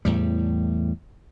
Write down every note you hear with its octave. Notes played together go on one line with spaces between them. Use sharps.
E2 A2 G3